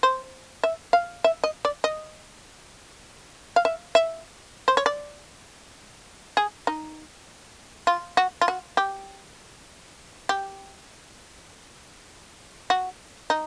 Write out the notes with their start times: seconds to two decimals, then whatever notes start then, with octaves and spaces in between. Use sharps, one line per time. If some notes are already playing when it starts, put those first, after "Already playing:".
0.03 C5
0.63 E5
0.93 F5
1.24 E5
1.44 D#5
1.65 D5
1.84 D#5
3.56 F5
3.65 E5
3.95 E5
4.68 C5
4.77 C#5
4.86 D5
6.37 G#4
6.67 D#4
7.87 F4
8.17 F#4
8.41 F4
8.48 F#4
8.77 G4
10.29 G4
12.70 F#4
13.30 D#4